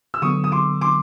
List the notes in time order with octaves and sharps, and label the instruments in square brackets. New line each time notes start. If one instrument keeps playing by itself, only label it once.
[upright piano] E6
[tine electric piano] D3 F#3 B3 [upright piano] C#6 D#6
[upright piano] D#6
C6 D6
C6 D6